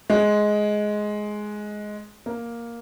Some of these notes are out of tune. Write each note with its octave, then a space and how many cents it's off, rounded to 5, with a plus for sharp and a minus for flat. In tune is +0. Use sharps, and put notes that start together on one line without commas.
G#3 +10
A#3 +5